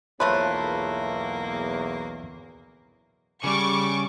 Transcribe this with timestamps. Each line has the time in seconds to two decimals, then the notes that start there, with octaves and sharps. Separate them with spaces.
0.20 B1 E2 F3 A3 A#3 B4 C#5 C6
3.44 C#3 G3 C#6 D6